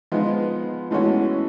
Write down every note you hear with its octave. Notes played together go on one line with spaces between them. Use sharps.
F3 G#3 B3 D#4
A2 E3 G#3 C#4 F#4